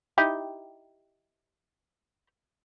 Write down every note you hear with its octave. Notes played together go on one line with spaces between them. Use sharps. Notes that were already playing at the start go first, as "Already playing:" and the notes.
D#4 E4 G4